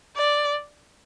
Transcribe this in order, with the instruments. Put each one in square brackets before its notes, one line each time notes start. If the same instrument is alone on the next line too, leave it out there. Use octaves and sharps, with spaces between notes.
[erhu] D5